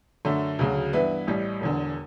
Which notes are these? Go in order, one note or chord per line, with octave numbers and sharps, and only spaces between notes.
F#2 D3 A3
D2 C#3 F#3
G2 E3 B3 E4
A1 A2 G3
E1 E2 D3